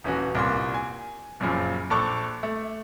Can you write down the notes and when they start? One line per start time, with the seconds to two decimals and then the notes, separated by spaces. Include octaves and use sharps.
0.04 D#1 E3 C#4 F#4
0.35 C2 A#2 A#3 C6
0.74 G#5
1.40 F#1 F#2 A#2 C#3 F3
1.90 A#1 A4 A5 C#6 D6 F#6
2.43 A3